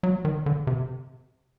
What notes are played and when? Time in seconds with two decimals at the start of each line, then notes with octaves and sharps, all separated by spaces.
0.03 F#3
0.25 D#3
0.46 D3
0.67 C3